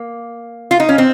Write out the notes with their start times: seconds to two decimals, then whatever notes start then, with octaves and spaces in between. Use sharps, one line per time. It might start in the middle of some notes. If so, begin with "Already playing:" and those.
Already playing: A#3
0.71 F4
0.80 D#4
0.89 C#4
0.98 C4